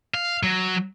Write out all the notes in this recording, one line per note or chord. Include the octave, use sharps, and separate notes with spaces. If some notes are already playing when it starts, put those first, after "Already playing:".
F5
F#3